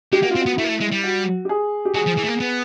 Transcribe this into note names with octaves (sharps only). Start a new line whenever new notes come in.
G#3 G4
A#3 F#4
F4
C4
F#4
B3
A3 E4
A#3
A3
G#3
G3
F#4
G4
G#4
G4
F#3 G#4
F3
E3
A3
A#3
B3